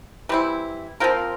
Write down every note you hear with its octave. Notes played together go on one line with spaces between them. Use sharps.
E3 G3 C4 E4
F3 C4 F4 A#4